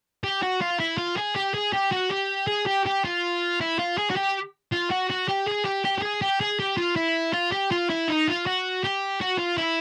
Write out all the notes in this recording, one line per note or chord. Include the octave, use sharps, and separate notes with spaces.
G4
F#4
F4
E4
F4
G#4
G4
G#4
G4
F#4
G4
G#4
G4
G4
F4
E4
F4
G#4
F#4
G4
F4
F#4
F#4
G4
G#4
G4
G4
G4
G#4
G4
G#4
G4
F4
E4
F4
G4
F4
E4
D#4
F4
F#4
G4
F#4
F4
E4